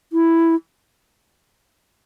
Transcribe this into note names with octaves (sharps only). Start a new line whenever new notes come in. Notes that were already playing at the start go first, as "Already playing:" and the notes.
E4